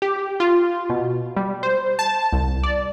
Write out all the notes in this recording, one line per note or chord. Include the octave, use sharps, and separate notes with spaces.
G4
F4
B2
G3
C5
A5
C2
D5